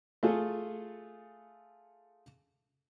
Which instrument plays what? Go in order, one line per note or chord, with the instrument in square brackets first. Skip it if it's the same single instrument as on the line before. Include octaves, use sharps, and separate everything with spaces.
[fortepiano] A3 F4 G#4 A4